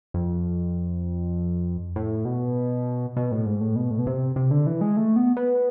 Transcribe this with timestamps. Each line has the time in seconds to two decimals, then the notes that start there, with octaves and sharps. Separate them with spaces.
0.14 F2
1.96 A2
2.25 B2
3.17 B2
3.31 A2
3.46 G#2
3.61 A2
3.76 B2
3.90 A2
3.99 B2
4.07 C3
4.36 C3
4.51 D3
4.66 E3
4.81 G#3
4.96 A3
5.16 B3
5.37 B3